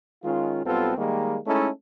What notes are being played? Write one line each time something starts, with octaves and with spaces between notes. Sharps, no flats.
D#3 G#3 C#4 F4
B1 G3 B3 C4 F4 A4
D#3 G3 G#3 A#3
G#3 A3 C#4 D#4 E4 A4